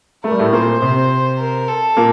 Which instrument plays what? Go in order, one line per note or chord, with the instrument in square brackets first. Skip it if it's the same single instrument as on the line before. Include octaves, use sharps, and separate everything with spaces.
[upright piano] A3 [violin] A#4
[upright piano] G3
A2 A3
[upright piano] A#2 A#3 [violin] C5
[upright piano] C3 C4
[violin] A#4
A4
[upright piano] A#2 A#3